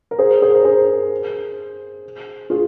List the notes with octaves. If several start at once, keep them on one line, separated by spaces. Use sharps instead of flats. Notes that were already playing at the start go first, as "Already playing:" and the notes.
A#4
G#4 C5
G#4 C5
A#4
G#4 C5
F4 G#4